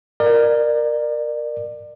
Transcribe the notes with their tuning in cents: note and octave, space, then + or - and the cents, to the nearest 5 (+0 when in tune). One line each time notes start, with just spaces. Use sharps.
A#4 +0 D5 +30